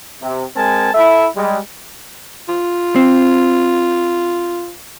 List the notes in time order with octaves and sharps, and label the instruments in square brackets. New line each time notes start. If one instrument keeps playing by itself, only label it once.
[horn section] C3
G#3 C4 A#4 G#5 A5
E4 A4 E5
G3 G#3
[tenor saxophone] F4
[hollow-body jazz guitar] C4